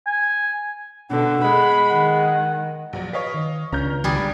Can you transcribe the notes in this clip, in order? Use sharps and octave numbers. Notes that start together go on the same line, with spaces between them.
G#5
B2 D3 F#5
G#3 B5
D#3 F#5
A#1 F#3
B4 C#5 D#5 F5
D#3
C#2 C#4 D4 A#5 F6 G6
G1 D#2 D3 G3 G4 G#4